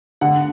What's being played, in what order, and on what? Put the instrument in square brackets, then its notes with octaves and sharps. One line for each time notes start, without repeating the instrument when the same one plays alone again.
[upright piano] D3 F#5